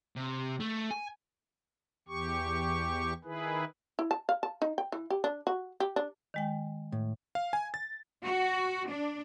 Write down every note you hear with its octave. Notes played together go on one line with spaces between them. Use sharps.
C3
A3
G#5
E2 G4 C#6
D#3 E4 G#4 B4
E4
A5
F5
A5
D#4
G5
E3
G4
D4
F#4
G4
D4
D#3 G#3 G5
A2
F5
G#5
A6
F#4
D4